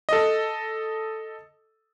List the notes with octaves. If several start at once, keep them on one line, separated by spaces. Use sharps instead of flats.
A4 D#5